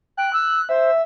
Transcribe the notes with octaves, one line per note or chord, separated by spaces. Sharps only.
G5 F#6
E6
C5 E5